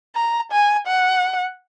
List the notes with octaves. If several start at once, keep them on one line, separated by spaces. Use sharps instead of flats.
A#5
G#5
F#5